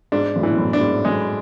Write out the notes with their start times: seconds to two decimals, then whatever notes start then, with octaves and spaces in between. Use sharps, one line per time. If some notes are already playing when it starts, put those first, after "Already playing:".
0.12 G#2 D4
0.36 F#2 A2
0.43 E3
0.49 B2
0.58 F#2 A2
0.73 D4
0.81 G#2
1.05 F#2 G#3